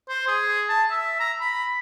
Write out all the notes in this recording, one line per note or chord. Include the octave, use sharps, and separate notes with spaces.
C5
G#4
A5
E5
A#5
B5